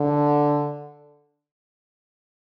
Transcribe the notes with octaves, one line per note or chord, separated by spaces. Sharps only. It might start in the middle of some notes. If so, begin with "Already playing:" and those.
Already playing: D3